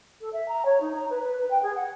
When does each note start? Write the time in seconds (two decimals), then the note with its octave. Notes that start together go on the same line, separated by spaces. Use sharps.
0.21 A4
0.33 E5
0.48 A#5
0.65 C#5
0.81 D#4
0.95 A#5
1.10 B4
1.23 B4
1.38 B4
1.51 G5
1.62 G#4
1.76 F#5